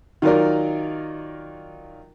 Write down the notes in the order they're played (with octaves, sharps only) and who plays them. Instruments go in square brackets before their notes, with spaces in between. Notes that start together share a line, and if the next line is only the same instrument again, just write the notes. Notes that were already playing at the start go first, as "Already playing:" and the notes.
[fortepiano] D#3 F#3 D#4 F4 A#4 D5